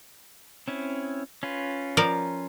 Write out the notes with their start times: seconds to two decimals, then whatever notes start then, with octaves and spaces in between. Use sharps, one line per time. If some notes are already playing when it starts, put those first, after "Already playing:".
0.68 C4 C#4 E4
1.43 C#4 F4 B4
1.97 F3 A#4 D5